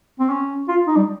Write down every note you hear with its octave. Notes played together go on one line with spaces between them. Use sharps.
C4
C#4
F4
D#4
G3